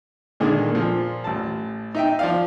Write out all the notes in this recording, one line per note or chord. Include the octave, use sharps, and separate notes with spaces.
A#2 D3 D#3 G#3
A#2 F3
A1 A5
D#4 E5 G5
F3 D5 F5